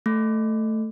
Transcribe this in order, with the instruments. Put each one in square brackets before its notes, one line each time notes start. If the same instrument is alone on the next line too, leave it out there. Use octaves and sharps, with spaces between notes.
[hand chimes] A3